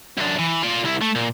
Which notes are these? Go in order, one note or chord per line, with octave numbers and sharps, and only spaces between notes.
F#2 D4
E3
F4 D5
C2 E4
A3
A#2